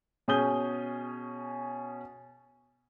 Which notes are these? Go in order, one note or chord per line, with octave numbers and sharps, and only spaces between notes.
B2 C#4 G#4 D#6 G6 G7